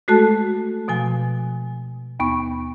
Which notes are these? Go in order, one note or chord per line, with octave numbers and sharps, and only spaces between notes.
G#3 A3 F#4 A4 A5
B2 F3 G#5
D#2 B3 C#6